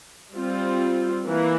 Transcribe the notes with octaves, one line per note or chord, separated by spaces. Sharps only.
G3 C4 F4
E3 A#3